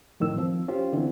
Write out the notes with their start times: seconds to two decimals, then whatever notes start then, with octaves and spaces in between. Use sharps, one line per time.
0.20 F2 A2 D#3 E6
0.37 F3 C4
0.68 C#4 F4 G4 C5
0.93 D3 E3 C4